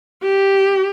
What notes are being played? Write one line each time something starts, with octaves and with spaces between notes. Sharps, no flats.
G4